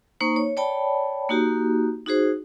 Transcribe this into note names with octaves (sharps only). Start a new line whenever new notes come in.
A#3 D#4 C5 C#6
C#5
C#5 D5 G5 A5 B5
A#3 D#4 F#4 G4
D#4 F#4 G#4 C5